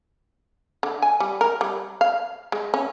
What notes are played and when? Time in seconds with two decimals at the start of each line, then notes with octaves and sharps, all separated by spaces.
0.83 D3
1.02 G#5
1.20 G3
1.41 A#4
1.61 G3
2.01 F5
2.52 G#3
2.74 C#4